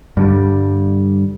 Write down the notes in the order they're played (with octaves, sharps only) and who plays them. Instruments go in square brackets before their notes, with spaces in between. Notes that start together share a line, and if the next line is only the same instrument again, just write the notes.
[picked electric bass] G2 D3 G3